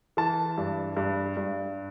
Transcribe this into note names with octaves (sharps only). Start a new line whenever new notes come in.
E3 A5
G2
G2
G2